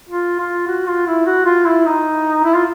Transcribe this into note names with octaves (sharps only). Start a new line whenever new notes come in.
F4
F4
F#4
F4
E4
F#4
F4
E4
D#4
E4
F4